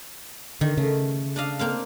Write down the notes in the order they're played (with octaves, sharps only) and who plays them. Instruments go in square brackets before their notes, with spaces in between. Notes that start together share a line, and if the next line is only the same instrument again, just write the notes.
[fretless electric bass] D3 [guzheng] D#3
[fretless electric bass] C#3 [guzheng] A3
[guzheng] D4 D#5 F5
A#3 C4 F5